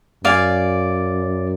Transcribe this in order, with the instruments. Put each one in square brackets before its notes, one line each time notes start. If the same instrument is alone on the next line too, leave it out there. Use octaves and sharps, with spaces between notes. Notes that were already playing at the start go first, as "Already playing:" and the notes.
[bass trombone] F#2 [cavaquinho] D5 F5 G#5